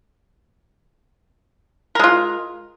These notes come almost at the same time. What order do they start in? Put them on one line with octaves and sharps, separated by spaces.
A#4 G#3 F4